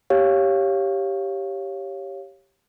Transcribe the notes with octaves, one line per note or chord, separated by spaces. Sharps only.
G4 C#5 F5